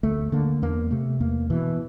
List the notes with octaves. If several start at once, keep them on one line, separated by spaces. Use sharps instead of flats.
D2 A3
D3 A#3
E2 A#3
C3 A3
E2 A#3
B2 E3